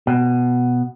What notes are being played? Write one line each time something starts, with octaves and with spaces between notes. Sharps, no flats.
B2